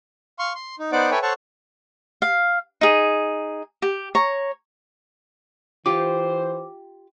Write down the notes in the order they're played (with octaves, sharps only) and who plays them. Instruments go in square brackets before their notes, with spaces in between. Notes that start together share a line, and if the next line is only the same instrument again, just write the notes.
[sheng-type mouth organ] F5 C6 C#6
C6
D#4
B3 D#4 C5 D5 F#5 D6
A4 B4 C#5 E5 G5 G#5
A4 C5 C#5 F#5 A5 C#6
[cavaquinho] F5
D#4 G#4
G4
C#5 A#5
[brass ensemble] E3 C5 [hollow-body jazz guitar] F4 G4 [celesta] D6